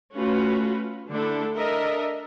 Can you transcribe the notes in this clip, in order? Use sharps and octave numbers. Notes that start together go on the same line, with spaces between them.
A3 C#4 F4 F#4 B4
D3 A3 D4 E4 A4
D4 A4 A#4 D#5 E5